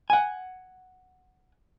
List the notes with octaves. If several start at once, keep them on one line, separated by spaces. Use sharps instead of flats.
F#5 G#5